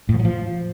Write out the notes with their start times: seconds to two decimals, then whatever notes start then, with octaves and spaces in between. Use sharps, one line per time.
0.09 A2
0.14 F3
0.19 F#3
0.25 F3